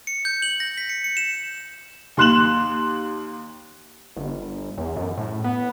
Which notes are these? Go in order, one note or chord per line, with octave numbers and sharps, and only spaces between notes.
C#7
G6
F#7
A#6
B6
C#7
C#7
E7
D#2 C6 F#6 E7 F#7
G1
E2
F#2
A2
B3